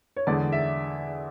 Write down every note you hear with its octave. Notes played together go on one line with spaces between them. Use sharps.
C#5
E2 D3 G#3 D5
E5